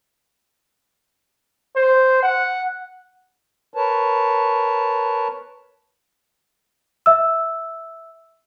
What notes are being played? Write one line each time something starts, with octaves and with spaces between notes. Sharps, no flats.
C5
F#5
A#4 B4 C#5 A5
E5 E6